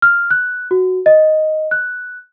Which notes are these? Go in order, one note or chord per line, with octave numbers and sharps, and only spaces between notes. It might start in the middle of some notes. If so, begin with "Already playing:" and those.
F6
F#6
F#4
D#5
F#6